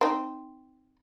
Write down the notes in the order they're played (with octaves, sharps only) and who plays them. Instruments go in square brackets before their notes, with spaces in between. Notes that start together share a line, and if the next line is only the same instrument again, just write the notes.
[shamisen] C4 D#4